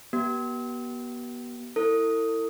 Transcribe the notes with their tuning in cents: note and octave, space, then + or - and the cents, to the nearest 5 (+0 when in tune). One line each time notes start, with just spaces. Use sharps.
B3 -35 G4 -45
E4 +0 A4 +45